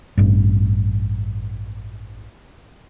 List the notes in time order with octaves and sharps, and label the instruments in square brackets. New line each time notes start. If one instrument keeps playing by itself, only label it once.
[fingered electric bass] A1 G2